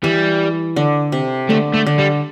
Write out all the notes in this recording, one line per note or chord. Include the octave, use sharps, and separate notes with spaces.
E3 G3
D3
C3
D3 A3
A3
D3
G3